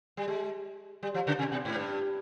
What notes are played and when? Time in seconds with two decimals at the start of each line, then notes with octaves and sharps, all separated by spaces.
0.17 G3
0.28 G#3
1.03 G3
1.14 F3
1.27 C#3
1.39 C3
1.52 B2
1.65 G#2
1.76 G2